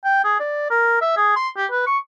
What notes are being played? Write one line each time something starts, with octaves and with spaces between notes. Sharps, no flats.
G5
G#4
D5
A#4
E5
G#4
C6
G4
B4
C#6